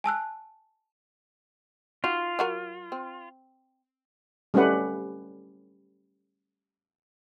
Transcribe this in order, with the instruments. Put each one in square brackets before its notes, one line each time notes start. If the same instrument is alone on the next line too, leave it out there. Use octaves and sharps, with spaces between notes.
[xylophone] G#5 A5 E6 F#6
[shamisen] D#4 F#4 [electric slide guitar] F4
[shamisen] F#3 F#4 A#4
C4
[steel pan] G3 A3 C#4 G4 B4 F#5